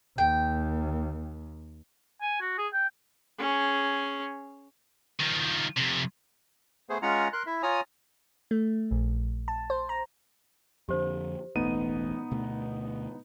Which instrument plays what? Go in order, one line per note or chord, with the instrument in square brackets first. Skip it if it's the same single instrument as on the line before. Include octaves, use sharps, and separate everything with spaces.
[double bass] D#2 [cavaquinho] G5
[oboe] G#5
F#4
G#4
G5
[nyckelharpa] C#4 G#4
[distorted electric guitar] D#3 F3
F2 C3
[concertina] A3 B3 G#4 C5
G#3 C#4 F4 F#5 A#5
A#4 C6 F#6
E4 E5
F4 C#5 G#5 A#5 D#6
[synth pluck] A3
A#1
A5
C5
A#5
[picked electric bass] F2 D3 [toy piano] G4 C5
[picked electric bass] E1 A1 A3 [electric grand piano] B3 D#4 D#7
[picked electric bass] D2 B2 A3